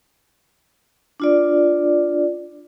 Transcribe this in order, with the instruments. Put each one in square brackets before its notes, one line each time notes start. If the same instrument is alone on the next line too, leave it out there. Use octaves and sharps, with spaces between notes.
[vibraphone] D4 F4 D5